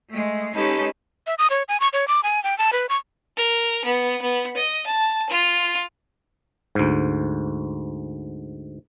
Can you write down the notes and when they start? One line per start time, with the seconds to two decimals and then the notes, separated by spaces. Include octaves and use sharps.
0.10 G#3 A3
0.54 G#3 C#4 D#4 G4 A4 B4
1.27 E5
1.38 D#6
1.50 C#5
1.68 G#5
1.80 C#6
1.93 C#5
2.08 D6
2.24 G#5
2.44 G5
2.58 A5
2.73 B4
2.89 C#6
3.37 A#4
3.85 B3
4.21 B3
4.57 D#5
4.87 A5
5.29 F4
6.75 D2 G#2